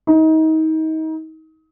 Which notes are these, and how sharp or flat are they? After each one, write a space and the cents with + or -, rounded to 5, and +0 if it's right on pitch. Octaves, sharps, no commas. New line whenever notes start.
D#4 +30